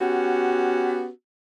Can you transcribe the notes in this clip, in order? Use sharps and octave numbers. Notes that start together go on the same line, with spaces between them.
B3 C#4 F#4 G4